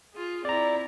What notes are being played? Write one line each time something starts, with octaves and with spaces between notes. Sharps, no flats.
F4 G#4
C4 E4 D5 A#5